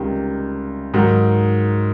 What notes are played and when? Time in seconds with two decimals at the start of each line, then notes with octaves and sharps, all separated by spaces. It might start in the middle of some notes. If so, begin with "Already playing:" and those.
Already playing: C#2 C3 D#3 G3
0.94 G#2 D#3 F#3